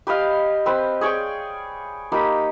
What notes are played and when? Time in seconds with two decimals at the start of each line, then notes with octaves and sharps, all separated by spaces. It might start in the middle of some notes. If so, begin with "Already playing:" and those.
0.07 G4 B4 D#5 F5
0.66 C4 B4
1.01 G#4 C#5 D5 G5
2.12 A#3 D#4 G4 B5